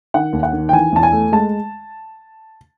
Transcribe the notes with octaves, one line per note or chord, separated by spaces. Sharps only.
D#3 F#5
D#2
F#5
D#3
G5
E3 G#5
E2 A5
G#5
A3
G#3 A5